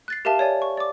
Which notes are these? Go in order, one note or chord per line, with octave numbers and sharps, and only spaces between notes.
F#6 A6 C7
G4 A#4 E5 F5 A5
C#5 D5 G#5
C#6
D5 D6